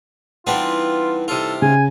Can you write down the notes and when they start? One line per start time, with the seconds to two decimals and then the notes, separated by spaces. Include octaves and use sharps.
0.47 E3 G3 B3 C4 D4 D#4 F4
1.28 C3 F4 A4
1.62 C#3 G#5